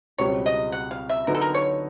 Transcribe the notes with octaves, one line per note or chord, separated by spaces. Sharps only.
C#2 B2 G3 C4 C#5
D#5
F#5
F5
E5
D3 F#3 B3 D#4 A#4
A4
A#4
C#5